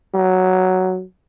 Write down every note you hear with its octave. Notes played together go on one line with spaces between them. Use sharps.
F#3